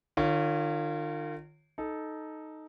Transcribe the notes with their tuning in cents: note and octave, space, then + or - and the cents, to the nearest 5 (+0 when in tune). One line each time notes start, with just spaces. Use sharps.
D#3 -40 F4 +0 C#5 +0
D#4 +0 A4 -15